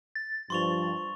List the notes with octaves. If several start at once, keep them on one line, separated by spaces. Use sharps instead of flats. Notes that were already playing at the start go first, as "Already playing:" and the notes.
A6
G2 F3 C6 C#6 F7